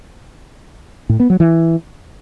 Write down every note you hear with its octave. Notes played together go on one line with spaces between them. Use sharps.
A2
B3
F#3
E3